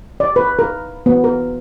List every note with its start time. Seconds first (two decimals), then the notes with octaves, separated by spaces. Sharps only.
0.20 D5
0.36 B4
0.59 A#4
1.06 B3
1.24 A#4